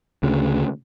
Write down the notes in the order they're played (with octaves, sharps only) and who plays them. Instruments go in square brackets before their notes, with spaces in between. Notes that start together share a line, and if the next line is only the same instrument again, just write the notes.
[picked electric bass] D2 C#3